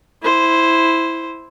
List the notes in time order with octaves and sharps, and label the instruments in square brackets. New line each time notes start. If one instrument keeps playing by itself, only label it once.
[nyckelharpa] E4 C5